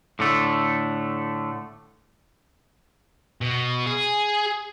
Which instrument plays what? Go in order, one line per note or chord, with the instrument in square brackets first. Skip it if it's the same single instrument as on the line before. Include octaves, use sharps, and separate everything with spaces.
[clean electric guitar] A2 D3 A3
[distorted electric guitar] B2
G#4